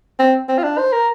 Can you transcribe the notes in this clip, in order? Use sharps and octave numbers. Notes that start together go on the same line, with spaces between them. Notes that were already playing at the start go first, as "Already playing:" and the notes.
C4
C4
F4
D4
C5
A#4